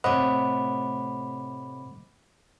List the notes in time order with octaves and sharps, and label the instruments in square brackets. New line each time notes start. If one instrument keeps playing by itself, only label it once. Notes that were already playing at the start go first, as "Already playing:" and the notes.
[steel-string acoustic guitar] A2 C3 [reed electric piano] C5 D#5 F#5 [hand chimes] B5 D6